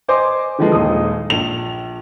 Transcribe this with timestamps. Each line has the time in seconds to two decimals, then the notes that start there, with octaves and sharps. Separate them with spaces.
0.09 C5 D#5 G#5 D6
0.59 D3 F3 G#3 B4
0.72 D#1 D#2 G#3 D#6
1.30 A#1 F7